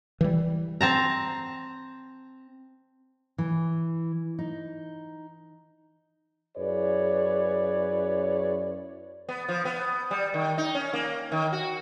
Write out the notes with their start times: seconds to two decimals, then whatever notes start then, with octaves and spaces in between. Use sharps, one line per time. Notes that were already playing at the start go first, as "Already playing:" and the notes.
0.21 E3 G3
0.81 C4 A5 A#5
3.38 E3
4.39 D#4
6.56 F#2 E4 G#4 B4 C#5 D5
9.29 B3
9.49 F3
9.65 B3
10.11 G3
10.34 D#3
10.58 D#4
10.75 C#4
10.94 A#3
11.32 D#3
11.53 F#4